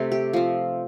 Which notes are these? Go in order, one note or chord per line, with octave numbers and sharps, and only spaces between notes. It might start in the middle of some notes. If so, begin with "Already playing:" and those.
Already playing: C3 A3 C4 A4
G4
F3 C4